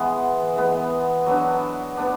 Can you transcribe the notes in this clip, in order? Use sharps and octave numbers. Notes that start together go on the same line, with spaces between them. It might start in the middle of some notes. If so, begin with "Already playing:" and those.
Already playing: E3 G#3 B3
E3 G#3 B3
F#3 B3 D4
B3 D4